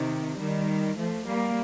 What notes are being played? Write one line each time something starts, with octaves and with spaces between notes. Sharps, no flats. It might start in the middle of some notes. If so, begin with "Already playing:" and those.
Already playing: C3 D#3
D#3 G3
F3 A3
G3 A#3